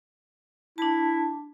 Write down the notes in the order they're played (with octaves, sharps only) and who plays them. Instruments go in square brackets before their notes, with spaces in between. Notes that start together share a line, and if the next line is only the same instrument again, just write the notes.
[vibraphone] D4 A5 [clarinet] E4